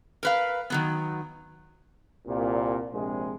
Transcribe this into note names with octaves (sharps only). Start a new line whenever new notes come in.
A#4 B4 F5
D#3 F#3 B3
C2 A#2
A#1 C3 G#3